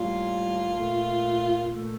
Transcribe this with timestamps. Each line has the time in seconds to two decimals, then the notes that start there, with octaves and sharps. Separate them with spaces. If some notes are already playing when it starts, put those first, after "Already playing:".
Already playing: A2 G3 A#3 F4
0.77 A#2 A3
1.70 A#2 A3